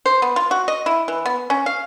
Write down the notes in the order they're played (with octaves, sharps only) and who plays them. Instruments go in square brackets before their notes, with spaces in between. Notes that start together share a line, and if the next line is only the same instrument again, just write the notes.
[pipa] C5
B3
F4
F#4
D#5
E4
E3
B3
C#4
F5